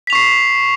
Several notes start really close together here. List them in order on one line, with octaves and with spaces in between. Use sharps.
B6 F7 C#6 C7